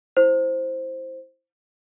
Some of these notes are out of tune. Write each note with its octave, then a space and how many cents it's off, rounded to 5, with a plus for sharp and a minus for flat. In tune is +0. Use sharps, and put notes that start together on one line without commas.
E4 +0 C5 +5